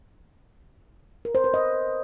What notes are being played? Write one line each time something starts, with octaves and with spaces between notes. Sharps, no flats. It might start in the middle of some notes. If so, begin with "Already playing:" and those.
A#4
C5
B4
D#5